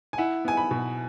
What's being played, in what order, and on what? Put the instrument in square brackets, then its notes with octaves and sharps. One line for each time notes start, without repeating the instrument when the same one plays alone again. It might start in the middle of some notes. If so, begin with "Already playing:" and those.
[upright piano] G#5
E4 F#5
B3 G#5
B5
B2